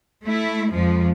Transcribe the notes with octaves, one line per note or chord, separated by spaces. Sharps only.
A3 E4
F2 F3 G#3